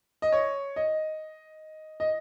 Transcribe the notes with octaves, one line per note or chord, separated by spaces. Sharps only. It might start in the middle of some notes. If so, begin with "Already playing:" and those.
D#5
C#5
D#5
D#5